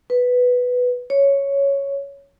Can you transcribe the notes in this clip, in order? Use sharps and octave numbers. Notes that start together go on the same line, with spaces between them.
B4
C#5